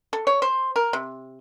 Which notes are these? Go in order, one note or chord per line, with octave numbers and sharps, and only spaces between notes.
A4
C#5
C5
A#4
C3